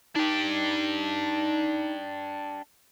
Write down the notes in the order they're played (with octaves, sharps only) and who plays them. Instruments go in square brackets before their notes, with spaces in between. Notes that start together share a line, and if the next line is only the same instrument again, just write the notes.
[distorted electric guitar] D4 G4 [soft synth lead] D#4